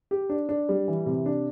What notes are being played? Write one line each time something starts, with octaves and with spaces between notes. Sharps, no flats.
G4
D4
D4
G3
E3
C3
D4